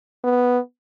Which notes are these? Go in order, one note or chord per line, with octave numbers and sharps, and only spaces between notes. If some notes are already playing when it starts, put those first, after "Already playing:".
B3